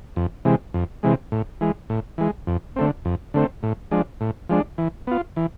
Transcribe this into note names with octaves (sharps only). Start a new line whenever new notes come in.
F2
C3 E3 G#3
F2
C3 E3 G#3
A2
E3 G#3
A2
E3 G#3
F2
D3 A3 C4
F2
D3 A3 C4
A2
F3 G#3 D4
A2
F3 G#3 D4
E3
B3 F4
E3